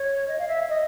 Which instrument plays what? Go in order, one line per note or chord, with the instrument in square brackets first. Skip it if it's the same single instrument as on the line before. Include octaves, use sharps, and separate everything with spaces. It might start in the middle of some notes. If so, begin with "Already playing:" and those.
Already playing: [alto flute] C#5
D#5
F5
E5
D#5